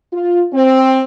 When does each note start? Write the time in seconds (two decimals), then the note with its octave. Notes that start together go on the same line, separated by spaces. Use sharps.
0.13 F4
0.53 C4